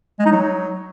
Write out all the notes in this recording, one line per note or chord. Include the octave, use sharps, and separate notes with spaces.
G#3
D#4
F#3